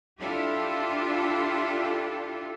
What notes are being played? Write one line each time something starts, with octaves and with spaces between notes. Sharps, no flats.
D4 E4 F4 G4 A4